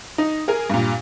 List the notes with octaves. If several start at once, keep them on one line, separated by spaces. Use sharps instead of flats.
D#4
G#4 A#4 G#5
G2 A#2